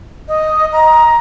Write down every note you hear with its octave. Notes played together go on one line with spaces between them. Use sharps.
D#5
A#5